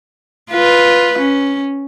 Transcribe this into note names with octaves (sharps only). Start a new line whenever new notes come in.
F4 B4
C#4